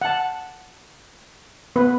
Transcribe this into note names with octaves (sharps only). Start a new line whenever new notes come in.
F#5 A5
B3 B4